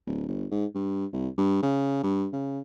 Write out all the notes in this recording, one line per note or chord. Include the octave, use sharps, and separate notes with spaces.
D1
G1
G#2
G2
C2
G2
C#3
G2
C#3